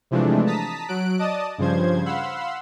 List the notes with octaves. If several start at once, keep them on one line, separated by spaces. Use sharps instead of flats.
C3 E3 F3 G#3 A3 D4
A5 A#5 D#6 B6
F#3 F#6 D7
D5 D#5 A5 D#6
G2 C#3 F3 C5 G#6
F5 F#5 B5 C6 E6